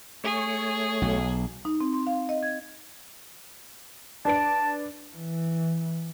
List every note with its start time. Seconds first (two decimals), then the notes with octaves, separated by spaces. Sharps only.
0.24 A3 G#4 C#5
1.02 B1
1.65 D#4
1.81 C4
1.93 C6
2.07 F5
2.29 D#5
2.43 G#6
4.25 D4 B4 A5 D7
5.14 E3